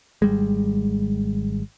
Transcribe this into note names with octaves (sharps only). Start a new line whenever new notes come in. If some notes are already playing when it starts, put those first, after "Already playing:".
G#1 G3 G#3